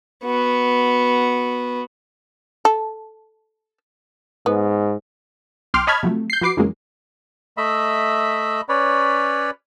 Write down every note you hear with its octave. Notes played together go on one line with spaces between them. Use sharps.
B3 F#4
A4
G#2 B3
B1 G5 C6 D6 F6
C#5 D#5 A5 B5 F6 G#6
C3 F3 F#3 A3
G6 C7
F3 F#4 B4 D6 C7
F2 C#3 E3 F#3 G#3 A#3
A3 D#5 E5 B5
C#4 B4 C#5 D5 B5